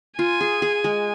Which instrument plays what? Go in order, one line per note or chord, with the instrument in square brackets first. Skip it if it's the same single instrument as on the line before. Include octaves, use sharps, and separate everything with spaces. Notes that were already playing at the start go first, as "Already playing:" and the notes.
[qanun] F4 [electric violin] G#5
[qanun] G#4
G#4
G#3